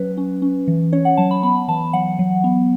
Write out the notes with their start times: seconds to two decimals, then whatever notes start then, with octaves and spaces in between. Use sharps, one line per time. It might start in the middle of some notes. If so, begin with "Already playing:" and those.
Already playing: F#3 C#4 B4
0.17 C#4
0.42 C#4
0.68 E3
0.93 C#4 C#5
1.05 F#5
1.17 F#3 A5
1.31 B5
1.43 B3 B5
1.68 E3 A5
1.93 F#3 F#5
2.19 F#3
2.44 B3